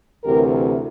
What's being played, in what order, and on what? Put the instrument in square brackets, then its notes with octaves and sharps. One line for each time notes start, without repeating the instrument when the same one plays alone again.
[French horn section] D2 C3 E3 G4 A#4